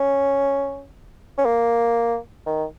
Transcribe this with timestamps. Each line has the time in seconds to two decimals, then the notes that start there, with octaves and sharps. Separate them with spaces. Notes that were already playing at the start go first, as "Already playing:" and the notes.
Already playing: C#4
1.38 C#4
1.45 A#3
2.47 D#3